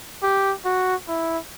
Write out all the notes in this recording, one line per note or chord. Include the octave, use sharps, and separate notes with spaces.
G4
F#4
E4